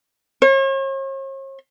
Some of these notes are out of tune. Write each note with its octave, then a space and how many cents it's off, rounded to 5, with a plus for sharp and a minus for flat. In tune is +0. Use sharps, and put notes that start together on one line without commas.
C#5 -45